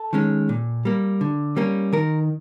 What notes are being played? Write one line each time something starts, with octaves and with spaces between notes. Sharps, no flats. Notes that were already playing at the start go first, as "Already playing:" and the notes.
Already playing: A4
D#3 G#3 C#4
A#2
G3 A#3
D3
G3 A#3 C#4
D#3 A#4